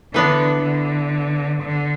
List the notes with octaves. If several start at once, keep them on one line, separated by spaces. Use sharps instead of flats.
D3 E3 B3 D4
D3
D3